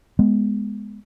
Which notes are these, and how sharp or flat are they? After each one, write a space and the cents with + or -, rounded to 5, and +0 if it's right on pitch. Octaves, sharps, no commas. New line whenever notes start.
G#3 +0 B3 +0